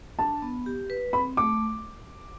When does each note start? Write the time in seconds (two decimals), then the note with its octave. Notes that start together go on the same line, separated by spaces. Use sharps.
0.18 D4 A5
0.42 B3
0.66 G4
0.90 B4
1.13 C4 B5
1.37 A3 D6